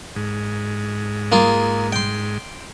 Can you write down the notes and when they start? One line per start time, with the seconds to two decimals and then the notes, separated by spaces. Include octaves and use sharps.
0.16 G#2
1.32 A#3 F4 G#4
1.92 G5 C6